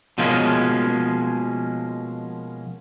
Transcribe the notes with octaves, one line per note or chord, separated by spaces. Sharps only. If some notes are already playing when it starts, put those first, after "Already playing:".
B2 F3 G#3 A#3 C#4